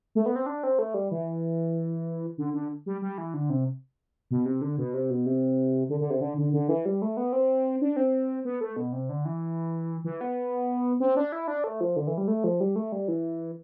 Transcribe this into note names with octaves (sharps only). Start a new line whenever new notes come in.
A3
B3
C4
D4
C4
A3
G3
E3
D3
D3
G3
G3
E3
D3
C3
B2
C3
D3
B2
C3
B2
C3
D3
D3
C3
D3
D3
D3
E3
G3
A3
B3
C4
D4
C4
B3
A3
B2
C3
D3
E3
E3
B3
C4
D4
E4
D4
A3
F3
D3
E3
G3
A3
F3
G3
A3
G3
E3